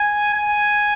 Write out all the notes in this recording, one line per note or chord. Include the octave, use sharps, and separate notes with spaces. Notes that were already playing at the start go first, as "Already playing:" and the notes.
Already playing: G#5
G#5